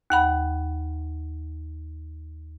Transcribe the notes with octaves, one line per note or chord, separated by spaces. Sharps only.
D#2 F#5 B5